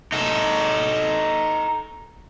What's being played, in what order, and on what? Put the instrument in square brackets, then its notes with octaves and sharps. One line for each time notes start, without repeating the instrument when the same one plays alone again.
[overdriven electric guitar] D#4 A4